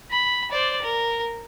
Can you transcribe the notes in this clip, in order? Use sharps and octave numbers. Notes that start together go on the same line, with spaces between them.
B5
C5 D5
A#4